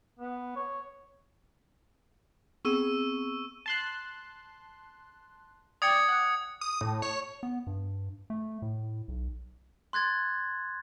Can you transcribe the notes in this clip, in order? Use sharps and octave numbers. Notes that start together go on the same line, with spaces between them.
B3
C#5
B3 C4 G#4 C#6 E6 D#7
A5 C6 F#6
D5 G5 D#6 G#6 C#7
F#5
D#6
A2
C#5
B3
G2
A3
A2
B1
C6 F#6 G#6 A6